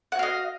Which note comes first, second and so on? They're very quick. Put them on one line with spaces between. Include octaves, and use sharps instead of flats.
F#5 F#4 F5 D#5